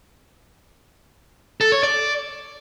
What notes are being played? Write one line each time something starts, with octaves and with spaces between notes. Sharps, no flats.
A4
C#5
D5